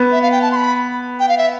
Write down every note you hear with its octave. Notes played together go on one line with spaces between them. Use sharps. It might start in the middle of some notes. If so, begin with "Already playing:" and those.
Already playing: B3
E5
F5
G5
A5
C6
B5
G5
F5
E5